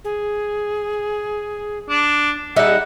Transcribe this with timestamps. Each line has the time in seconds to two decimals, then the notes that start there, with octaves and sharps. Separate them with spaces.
0.04 G#4
1.89 D4
2.56 G3 D#4 G#4 E5 F#5